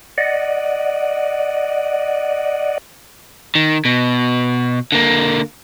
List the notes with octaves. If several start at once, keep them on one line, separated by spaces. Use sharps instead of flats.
D5 D#5 F#5
D#3
B2
D3 A#3